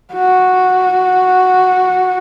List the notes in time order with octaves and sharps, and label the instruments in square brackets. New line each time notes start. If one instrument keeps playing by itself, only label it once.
[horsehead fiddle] F#4